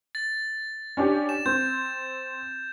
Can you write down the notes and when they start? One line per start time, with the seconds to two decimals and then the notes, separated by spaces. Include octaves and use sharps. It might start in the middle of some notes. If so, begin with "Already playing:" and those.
0.15 A6
0.97 C#4 D4 G4
1.29 E7
1.46 C4 G6